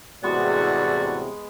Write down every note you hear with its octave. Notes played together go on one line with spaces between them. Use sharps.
E2 A2 C3 G#3 B3 F#4 D5 C#6